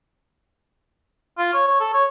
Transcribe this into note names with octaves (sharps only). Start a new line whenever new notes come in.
F4
C#5
C#5
A4
C#5